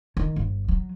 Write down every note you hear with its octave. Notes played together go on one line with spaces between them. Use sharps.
D#3
G1
F#3